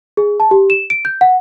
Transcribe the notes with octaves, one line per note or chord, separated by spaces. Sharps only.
G#4
A5
G4
E7
D7
G6
F#5